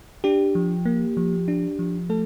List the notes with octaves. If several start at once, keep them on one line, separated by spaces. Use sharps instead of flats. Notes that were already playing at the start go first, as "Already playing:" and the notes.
D4 G4
F3
A#3
F3
D4
F3
A3 A4